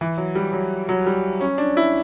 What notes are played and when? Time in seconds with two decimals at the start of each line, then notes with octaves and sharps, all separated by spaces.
0.01 E3
0.18 F#3
0.35 G3
0.53 F#3
0.89 F#3
1.06 G3
1.40 C#4
1.58 D4
1.77 E4